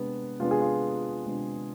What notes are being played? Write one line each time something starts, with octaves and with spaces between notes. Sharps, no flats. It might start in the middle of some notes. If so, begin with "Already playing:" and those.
Already playing: C3 G#3 B3 D4
C3 G#3 B3 D4 F4
G#4
F4
C3 G#3 B3 D4